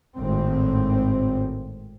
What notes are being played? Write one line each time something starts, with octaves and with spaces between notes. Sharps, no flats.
G#1 A2 C4